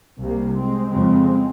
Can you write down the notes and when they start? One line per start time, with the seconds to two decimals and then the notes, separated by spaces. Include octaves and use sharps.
0.19 C2 C3 G3 A#3
0.55 G#3 C4
0.91 F2 C#3 G#3 C4